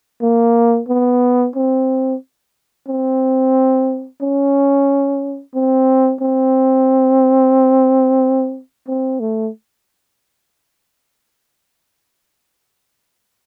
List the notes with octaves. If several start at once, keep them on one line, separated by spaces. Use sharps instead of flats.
A#3
B3
C4
C4
C#4
C4
C4
C4
A3